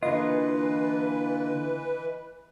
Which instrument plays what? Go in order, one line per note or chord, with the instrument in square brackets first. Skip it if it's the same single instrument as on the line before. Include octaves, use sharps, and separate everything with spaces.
[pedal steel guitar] D3 A#3 F4 [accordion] E3 B4 [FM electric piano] D#5